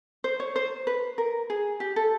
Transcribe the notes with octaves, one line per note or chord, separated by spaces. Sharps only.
C5
C#5
C5
B4
A#4
G#4
G4
A4